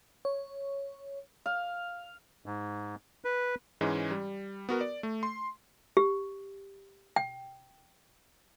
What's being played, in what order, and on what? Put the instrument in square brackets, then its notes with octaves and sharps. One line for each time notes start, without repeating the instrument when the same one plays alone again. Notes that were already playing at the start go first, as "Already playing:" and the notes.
[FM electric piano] C#5
[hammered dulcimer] F5
[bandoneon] G#2
B4
[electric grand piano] G#2 E3 G#3 C#4
G3
B3 F#4 A#4
D5
A3
C6
[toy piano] G4
G5